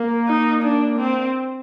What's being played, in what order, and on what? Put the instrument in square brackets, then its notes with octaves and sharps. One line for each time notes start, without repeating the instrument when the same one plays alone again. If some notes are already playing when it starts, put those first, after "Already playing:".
Already playing: [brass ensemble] A#3
[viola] D#4
D4
C4